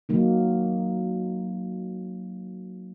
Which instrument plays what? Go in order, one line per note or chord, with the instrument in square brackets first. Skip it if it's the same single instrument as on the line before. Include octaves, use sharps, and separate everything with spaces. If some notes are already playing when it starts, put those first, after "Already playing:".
[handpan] F#3 A#3 D#4